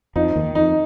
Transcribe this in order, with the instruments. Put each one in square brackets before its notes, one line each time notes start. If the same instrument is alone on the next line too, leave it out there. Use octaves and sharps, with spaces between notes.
[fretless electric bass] F2 F3 [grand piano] D#4
[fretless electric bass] D#2 D#3
[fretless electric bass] F2 [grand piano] D#4